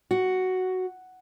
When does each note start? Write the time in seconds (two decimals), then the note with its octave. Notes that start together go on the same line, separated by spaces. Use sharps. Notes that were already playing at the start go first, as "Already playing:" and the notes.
0.11 F#4